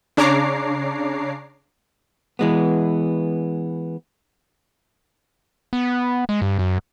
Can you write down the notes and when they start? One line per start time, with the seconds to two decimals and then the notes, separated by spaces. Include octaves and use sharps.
0.17 C#3 D4 C#5 A#5 D6 C7
2.39 E3 G#3 B3
5.73 B3
6.29 G#3
6.42 G2
6.59 F#2